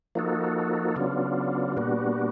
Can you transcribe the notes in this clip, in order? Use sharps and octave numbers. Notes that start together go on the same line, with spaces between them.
F3 A#3 D#4 F#4 A4
C#3 F#3 B3 D4 F4
A#2 G3 B3 D4 F#4